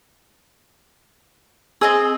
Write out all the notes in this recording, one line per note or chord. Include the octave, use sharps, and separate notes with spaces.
C4 G#4 D#5 E6